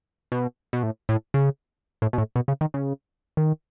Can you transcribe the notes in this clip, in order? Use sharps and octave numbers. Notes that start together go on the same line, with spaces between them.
B2
B2
A2
A2
C#3
A2
B2
A2
B2
C#3
D#3
C#3
D#3